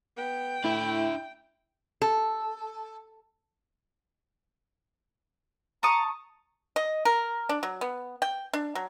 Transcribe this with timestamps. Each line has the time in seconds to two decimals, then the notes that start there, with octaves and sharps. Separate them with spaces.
0.17 B3 G5
0.64 A2 D4 E4 E5
2.02 A4
5.83 A5 A#5 C#6 D#6
6.76 D#5
7.05 A#4
7.49 D4
7.63 F#3
7.81 B3
8.22 G5
8.53 D4
8.75 F#3